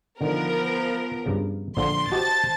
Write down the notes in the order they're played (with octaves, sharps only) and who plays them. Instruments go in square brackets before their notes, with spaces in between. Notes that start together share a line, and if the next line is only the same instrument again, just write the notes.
[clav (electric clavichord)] D3 D#3 [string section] F3 B3 A#4
[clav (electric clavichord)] G2 C#3
[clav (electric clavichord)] A#1 D3 F3 [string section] C6
[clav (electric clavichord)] F#4 G4 D#5 [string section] C5 A5 A6